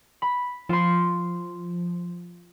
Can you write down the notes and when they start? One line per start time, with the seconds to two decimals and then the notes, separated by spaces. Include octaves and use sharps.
0.22 B5
0.69 F3 F4 C6